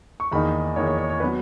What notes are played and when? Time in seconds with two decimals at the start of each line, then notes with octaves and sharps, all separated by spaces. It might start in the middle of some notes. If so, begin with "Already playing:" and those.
0.20 C#6
0.31 E2 D#3 A#3 D#4 B5
0.76 E2 D#3 A#3 D#4 C#5
0.87 C#5
0.98 C#5
1.09 C#5
1.20 F#3 B3 B4